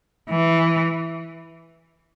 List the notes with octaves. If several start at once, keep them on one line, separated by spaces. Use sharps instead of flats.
E3